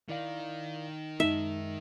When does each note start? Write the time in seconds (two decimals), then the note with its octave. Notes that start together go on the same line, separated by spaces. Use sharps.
0.09 D#3 E4 D5 F5
1.20 F#2 G#3 D#4 E5